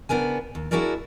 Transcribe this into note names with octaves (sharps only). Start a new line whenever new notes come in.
C#3 B3 D4 A#4 G#5
D#2
D4 E4 F#4 G#4 A#4 D5